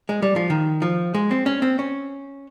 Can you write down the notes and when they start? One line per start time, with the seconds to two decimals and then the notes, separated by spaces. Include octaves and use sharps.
0.09 G#3
0.22 G3
0.36 F3
0.50 D#3
0.82 F3
1.15 G#3
1.31 C4
1.46 C#4
1.62 C4
1.79 C#4